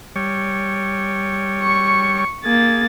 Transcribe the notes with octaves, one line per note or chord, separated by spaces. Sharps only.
G3 C#5
C#6
A#3 G#4 A6